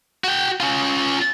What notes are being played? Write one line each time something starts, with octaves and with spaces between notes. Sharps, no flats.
F#4 G5
C#4 F4